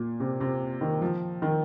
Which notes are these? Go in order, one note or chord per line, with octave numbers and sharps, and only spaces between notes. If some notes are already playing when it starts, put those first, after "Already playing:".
Already playing: A#2
C3
C3
D#3
F3
D#3